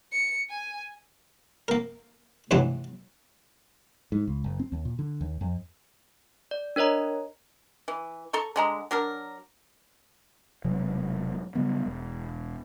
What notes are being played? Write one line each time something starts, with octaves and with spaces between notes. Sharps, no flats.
C#7
G#5
A#3 A#4
C#2 G2 C3 E3 F#3 A3
G#2
C#2
F#1
C4
D#2
A#2
D3
D#2
F2
D5
D4 A#4 C#5 D#5 A#5
E3
A4 A#5 C#6
D3 G#3 A#5
F#3 D4 A#4
E1 C3 F#3
C#3 F#3 G3 B3
E1